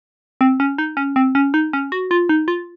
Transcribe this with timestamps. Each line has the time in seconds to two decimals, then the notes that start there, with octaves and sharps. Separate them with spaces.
0.41 C4
0.60 C#4
0.78 D#4
0.97 C#4
1.16 C4
1.35 C#4
1.54 D#4
1.73 C#4
1.92 F#4
2.11 F4
2.29 D#4
2.48 F4